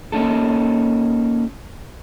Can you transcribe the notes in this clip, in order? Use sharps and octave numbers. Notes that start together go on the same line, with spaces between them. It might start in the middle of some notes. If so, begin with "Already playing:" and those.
A#3 C#4 D#4 A4